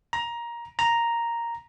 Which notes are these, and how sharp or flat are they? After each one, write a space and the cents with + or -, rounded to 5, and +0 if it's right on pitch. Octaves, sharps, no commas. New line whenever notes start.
A#5 +15
A#5 +0